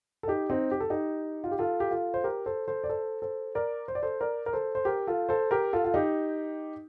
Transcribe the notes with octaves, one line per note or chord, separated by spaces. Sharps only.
A4
D#4 G4
C4 D#4
G4
A4
D#4 G4
F4
G4
F4 A4
G4
F4 A4
C5
G4 A#4
A4 C5
A4 C5
D5
A4 C5
A4 C5
A#4 D5
C5
D5
A4 C5
A#4 D5
A#4
A4 C5
C5
G4 A#4
F4 A4
A4 C5
G4 A#4
F4 A4
F4
D#4 G4